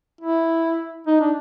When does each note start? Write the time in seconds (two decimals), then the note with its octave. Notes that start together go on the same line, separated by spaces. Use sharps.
0.21 E4
1.07 D#4
1.21 D4